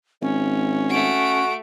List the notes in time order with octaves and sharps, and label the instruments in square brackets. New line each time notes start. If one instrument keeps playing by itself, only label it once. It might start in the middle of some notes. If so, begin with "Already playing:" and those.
[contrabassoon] G#1 [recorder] C#4
[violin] A3 D7 [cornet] F#4